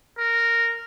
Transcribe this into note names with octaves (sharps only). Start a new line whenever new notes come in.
A#4